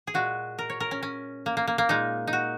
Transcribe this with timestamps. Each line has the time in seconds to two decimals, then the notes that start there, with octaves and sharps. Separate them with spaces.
0.07 G#4
0.14 A#2 G#3 F#4
0.59 A#4
0.70 C#5
0.80 A#4
0.91 C#4
1.03 C#4
1.46 A#3
1.57 A#3
1.67 A#3
1.78 A#3
1.89 A#2 G#3 D#4
2.27 D#4
2.33 F#4